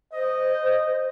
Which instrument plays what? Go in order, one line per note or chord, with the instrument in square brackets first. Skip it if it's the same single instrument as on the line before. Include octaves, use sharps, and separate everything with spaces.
[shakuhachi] C5 [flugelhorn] D#5